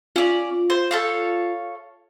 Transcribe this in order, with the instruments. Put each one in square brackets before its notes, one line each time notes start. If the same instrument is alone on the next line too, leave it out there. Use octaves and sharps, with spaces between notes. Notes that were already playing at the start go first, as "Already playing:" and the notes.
[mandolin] C#4 D5 [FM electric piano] F4
[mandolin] C5
A4 C#5 F5